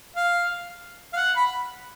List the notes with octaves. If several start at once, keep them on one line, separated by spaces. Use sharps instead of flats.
F5
F5
F#5
B5